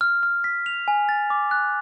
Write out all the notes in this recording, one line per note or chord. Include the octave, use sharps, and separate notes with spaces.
F6
F6
B6
F7
G#5
A6
D6
F#6